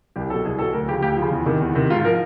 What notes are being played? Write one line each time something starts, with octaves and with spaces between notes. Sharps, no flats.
C2 G4
B2 F#3 A4
C2 G#4
B2 F#3 A4
D2 A#4
C#3 F3 G4
D2 G4
C#3 F3
E2
C3 D#3
E2
C3 D#3
G#2 F4
F3 A#4